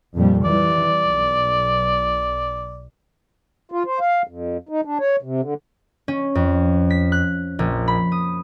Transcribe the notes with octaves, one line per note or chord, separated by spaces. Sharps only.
F2 A#2 G3
E3 G3 D5
B1
F4
C5
F5
F2
D#4
D4
C#5
C3
D3
C#4
F2
B6
F#6
A#1
B5
D#6